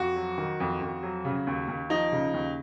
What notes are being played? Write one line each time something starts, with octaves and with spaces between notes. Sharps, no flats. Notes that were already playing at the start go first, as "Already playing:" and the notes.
Already playing: F2 F#4
F#3
D#3
F2
F2
F#3
C#3
D#2
D#2
F3 D#4
C#3
D#2